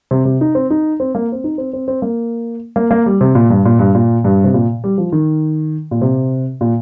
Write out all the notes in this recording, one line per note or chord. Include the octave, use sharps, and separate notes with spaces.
C3
C3
D#4
C4
D#4
C4
A#3
C4
D#4
C4
C4
C4
A#3
A#3
A#3
G3
C3
A#2
G2
A#2
G2
A#2
G2
C3
A#2
G3
F3
D#3
A#2
C3
A#2